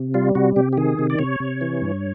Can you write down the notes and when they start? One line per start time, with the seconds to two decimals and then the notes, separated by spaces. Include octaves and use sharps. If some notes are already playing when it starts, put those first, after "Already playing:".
Already playing: C3
0.14 G3 F4
0.35 C3 F#4
0.56 C3 G4
0.73 G4
0.77 D#3 G#4
0.99 C3
1.10 D5
1.19 C3 C#5
1.40 C3
1.61 E3
1.82 G2